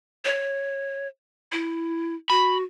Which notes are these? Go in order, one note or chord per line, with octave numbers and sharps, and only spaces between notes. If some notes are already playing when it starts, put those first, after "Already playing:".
C#5
E4
F#4 B5